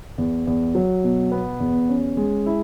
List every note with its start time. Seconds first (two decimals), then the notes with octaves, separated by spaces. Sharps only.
0.18 E2
0.47 E2
0.75 F#3
1.04 B2
1.32 B3
1.60 E2
1.89 C#4
2.17 G#3
2.46 E4